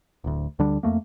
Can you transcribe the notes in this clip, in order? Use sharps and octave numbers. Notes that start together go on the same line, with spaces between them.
D1 D2
D2 D3 G3 D4
F2 A2 A3 A#3